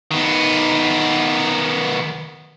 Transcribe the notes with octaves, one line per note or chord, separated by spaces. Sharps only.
D#3 B3